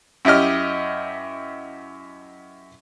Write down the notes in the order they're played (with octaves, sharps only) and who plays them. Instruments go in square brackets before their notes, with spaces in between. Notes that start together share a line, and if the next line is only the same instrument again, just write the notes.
[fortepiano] F#2 E4 G4 D#5 F6